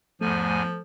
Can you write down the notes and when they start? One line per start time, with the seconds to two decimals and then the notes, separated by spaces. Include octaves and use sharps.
0.21 E2 G#2 F3 A3 G#5